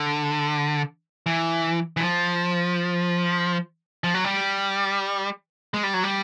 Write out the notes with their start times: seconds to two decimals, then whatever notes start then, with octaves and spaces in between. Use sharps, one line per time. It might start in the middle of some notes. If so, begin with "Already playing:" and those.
Already playing: D3
1.26 E3
1.97 E3
2.00 F3
4.04 F3
4.14 F#3
4.24 G3
5.74 G#3
5.83 G3
5.94 F#3
6.03 G3